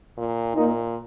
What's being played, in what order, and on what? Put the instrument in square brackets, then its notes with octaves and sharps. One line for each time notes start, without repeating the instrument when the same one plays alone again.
[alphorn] A#2
[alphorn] A#2 [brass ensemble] A#3 D#4